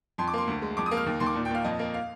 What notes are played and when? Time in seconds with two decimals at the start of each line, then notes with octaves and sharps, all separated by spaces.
0.18 F2 C6
0.28 D6
0.34 A#3 C6
0.48 D2
0.62 G#3
0.77 F2 D6
0.86 D#6
0.91 A#3
0.97 F6
1.06 D#2
1.20 D#2 C6
1.26 D6
1.36 A#2
1.45 G5
1.51 A#2 F5
1.64 F2 D#5
1.79 A#3
1.94 F5